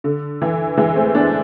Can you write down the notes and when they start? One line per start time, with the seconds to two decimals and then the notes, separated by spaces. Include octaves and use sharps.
0.04 D3
0.42 E3
0.77 E3 G#3
0.96 A3 C4
1.15 B3 D4